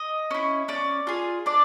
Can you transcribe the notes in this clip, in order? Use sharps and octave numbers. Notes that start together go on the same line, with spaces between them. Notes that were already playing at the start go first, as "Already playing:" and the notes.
Already playing: D#5
C#4 E4
C#4 D5
F4 G#4
D4 D5